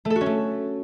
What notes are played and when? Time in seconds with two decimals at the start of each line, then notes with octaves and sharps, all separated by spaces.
0.05 A3
0.10 A4
0.16 F#4
0.21 C#4
0.26 A3